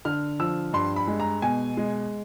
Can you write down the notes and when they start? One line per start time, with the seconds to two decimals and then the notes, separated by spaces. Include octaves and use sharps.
0.05 D3 F6
0.39 F3 E6
0.73 G2 C6
0.96 B5
1.07 G#3
1.20 A#5
1.42 B2 G#5
1.77 G#3